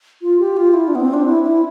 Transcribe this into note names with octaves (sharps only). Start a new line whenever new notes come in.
F4
G4
F4
E4
D4
B3
C4
D4
E4
E4